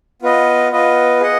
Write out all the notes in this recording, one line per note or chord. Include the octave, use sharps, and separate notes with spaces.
B3 F4 B4 D#5
B3 F4 B4 D#5
G#4 D#5 F#5